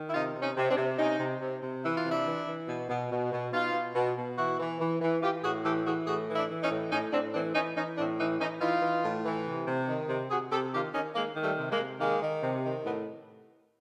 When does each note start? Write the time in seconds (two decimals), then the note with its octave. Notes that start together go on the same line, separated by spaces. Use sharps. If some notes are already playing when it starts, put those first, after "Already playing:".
Already playing: D#3
0.08 E4
0.14 C3 D#4 F4
0.35 C3
0.42 C#4 D#4
0.57 C3
0.70 C4 D4
0.77 C3
0.99 C3 C#4 D#4
1.19 C3
1.41 C3
1.62 C3
1.83 E3 E4
1.97 F4
2.04 C3
2.11 D4 E4
2.25 E3
2.47 E3
2.68 B2
2.89 B2
3.11 B2
3.32 B2
3.52 B2 D#4 F4
3.73 B2
3.95 B2
4.17 B2
4.37 E3 E4 F#4
4.59 E3
4.80 E3
5.01 E3
5.22 E3 F4 G4
5.43 A2 F#4 G#4
5.64 E3 G4 A4
5.86 E3 F#4 G#4
6.07 A2 F#4 G#4
6.28 E3
6.35 D4 E4
6.49 E3
6.63 C#4 D#4
6.71 A2
6.92 A2 C#4 D#4
7.12 A2 C4 D4
7.34 E3 C4 D4
7.55 E3 C#4 D#4
7.76 E3 C#4 D#4
7.97 A2 C4 D4
8.18 E3 C#4 D#4
8.40 E3 C#4 D#4
8.61 E3 D#4 F4
8.82 E3
9.04 A2
9.25 E3
9.46 C3
9.67 C3
9.88 D#3
10.09 C3
10.30 C3 F#4 G#4
10.51 C3 G4 A4
10.73 D#3 F4 G4
10.94 D#3 C#4 D#4
11.15 D#3 G#3 A#3
11.36 D#3
11.43 G3 A3
11.58 C3
11.72 G#3 A#3
11.79 C3
12.00 D#3 G#3 A#3
12.22 D#3
12.43 C3
12.64 D#3
12.85 A2 B3